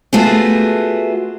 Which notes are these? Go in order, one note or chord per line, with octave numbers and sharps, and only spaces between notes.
A3 B3 F4 F#4 G#4